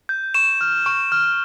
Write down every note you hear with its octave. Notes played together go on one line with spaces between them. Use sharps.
G6
C#6 E7
F6
C#6
F6